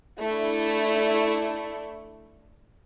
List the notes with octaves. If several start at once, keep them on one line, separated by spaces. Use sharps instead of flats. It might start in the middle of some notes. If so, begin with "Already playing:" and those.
A3 D4 E4